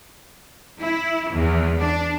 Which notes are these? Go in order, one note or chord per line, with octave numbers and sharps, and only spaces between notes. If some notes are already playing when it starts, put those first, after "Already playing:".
E4
E2
D4